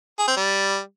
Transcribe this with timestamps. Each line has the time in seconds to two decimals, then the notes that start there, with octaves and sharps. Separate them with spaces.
0.19 G#4
0.28 C4
0.37 G3